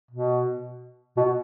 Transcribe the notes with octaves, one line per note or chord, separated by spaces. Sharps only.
B2
B2